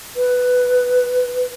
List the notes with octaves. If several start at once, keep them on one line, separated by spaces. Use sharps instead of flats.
B4